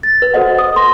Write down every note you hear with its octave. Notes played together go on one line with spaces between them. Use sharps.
A6
B4
F#4 A4 C5 D#5 F#5
D#6
A4 C6 A#6